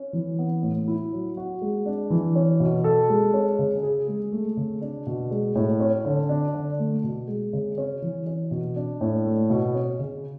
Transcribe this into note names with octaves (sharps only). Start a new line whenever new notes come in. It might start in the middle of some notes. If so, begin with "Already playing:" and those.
Already playing: C#4
E3
B3
A2
E4
F#3
F#4
G#3
D4
E3
C#4
B2
A4
G#3
C#4
C#3
G#4
G#3
A3
C#3
D4
B2
G#3
A2
C#4
D3
D4
D3
A3
B2
G#3
C#3
C#4
E3
C#4
B2
D4
A2
A3
B2
C#4
C#3